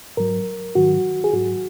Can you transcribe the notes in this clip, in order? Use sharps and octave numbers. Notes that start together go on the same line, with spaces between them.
G#2 F#3 A#4
G#2 D#3 F#3 F#4
G#4
G#2 F#3 F#4